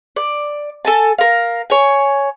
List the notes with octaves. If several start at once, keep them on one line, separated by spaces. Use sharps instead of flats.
D5
A4 G#5 A5
A#4 F5
C#5 G#5